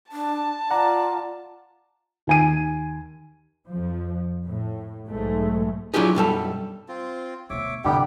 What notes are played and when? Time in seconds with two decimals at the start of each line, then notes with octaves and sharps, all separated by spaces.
0.12 D4 A5
0.71 F4 D5 F#5 A#5
2.27 D#2 G#5 D#7
3.69 F2 F3
4.45 A2
5.08 B1 G#2 G#3 A3
5.94 F#3 D4 E4 F4 G4 G#4
6.15 B1 F#2 G3 A4
6.88 C4 F4
7.50 D2 B2 C#5 E5 D6
7.84 C2 F2 D3 G3 B3 G4 G5 D6